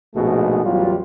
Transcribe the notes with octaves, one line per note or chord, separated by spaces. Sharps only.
A#1 G#2 B2 A3 F#4 G#4
A1 E2 F#3 G3 F4